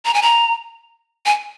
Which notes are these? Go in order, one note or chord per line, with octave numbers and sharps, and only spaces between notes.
A#5
G#5
A#5
G#5